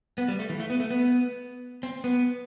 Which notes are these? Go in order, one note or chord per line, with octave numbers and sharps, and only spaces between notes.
B3
G3
A3
E3
A3
B3
A3
B3
C4
B3